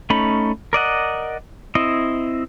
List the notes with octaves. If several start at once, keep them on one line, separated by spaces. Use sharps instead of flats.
A3 C#4 D#4 B5
A#4 D5 D#5 F#5
C4 E4 D#5